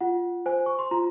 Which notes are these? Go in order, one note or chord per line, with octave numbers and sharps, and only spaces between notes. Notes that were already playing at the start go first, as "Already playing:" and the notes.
F4 F#5
C5 G#5
C#6
C6
F4 A#5